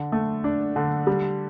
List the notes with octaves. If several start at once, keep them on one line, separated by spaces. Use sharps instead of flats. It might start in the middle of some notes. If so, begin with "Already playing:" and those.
Already playing: D3
A3
D4
D3
G3